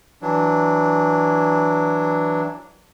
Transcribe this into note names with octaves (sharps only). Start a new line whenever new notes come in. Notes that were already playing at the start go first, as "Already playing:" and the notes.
E3 F#3 D4